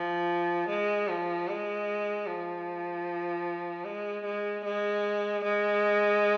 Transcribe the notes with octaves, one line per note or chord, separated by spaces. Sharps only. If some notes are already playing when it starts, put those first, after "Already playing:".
Already playing: F3
G#3
F3
G#3
F3
G#3
G#3
G#3
G#3